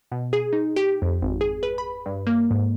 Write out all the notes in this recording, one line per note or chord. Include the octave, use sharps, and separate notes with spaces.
B2
G#4
D#4
G4
F2
G#1
G#4
B4
B5
G2
A#3
G#2